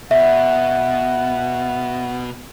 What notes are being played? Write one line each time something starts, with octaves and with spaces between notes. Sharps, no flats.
B2 E5 F#5